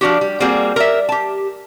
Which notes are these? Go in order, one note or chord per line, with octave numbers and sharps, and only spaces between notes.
F3 D4 F#4 G4
G3
G3 A#3 C4 F#4 G#4
A#4 D5 E5
G4 A5